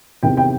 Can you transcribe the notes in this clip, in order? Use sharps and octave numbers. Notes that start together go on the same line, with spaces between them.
E2 C3 D#3 G5
G5